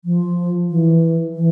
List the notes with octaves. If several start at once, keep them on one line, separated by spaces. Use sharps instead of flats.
F3
E3
E3